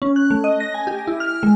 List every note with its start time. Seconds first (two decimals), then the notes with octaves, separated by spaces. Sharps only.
0.02 C#4
0.16 F#6
0.31 A3
0.44 D#5
0.60 A#6
0.74 G#5
0.87 G4
1.07 E4
1.20 F6
1.43 G#3